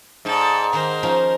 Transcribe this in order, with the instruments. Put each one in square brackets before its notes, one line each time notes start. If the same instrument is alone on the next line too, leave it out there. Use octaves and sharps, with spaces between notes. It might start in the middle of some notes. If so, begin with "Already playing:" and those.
[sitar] G#2 [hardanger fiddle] A4 D5
[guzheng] D#3 [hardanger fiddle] A#4 C5
[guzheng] F3 C#4 D#4